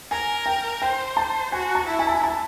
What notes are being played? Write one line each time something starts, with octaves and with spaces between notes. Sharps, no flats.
A#4 G#5
G5
C5 G5
A5
F#4 G#5
A5
E4
G#5
A5
G#5
A5